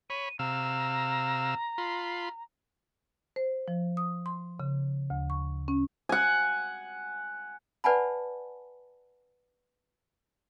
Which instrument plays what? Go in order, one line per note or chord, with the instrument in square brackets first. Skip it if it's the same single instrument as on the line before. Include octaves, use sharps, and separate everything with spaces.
[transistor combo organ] C#5 B5 [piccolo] D#7
[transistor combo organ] C3 F5 E6 [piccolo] A#5
[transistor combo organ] F4 B5 C6
[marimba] C5
F3
D#6
C6
C#3
D2
C#6
C#4
[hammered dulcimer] F#5 G#5
[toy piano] B4 D5 F#5 G#5 A5 B5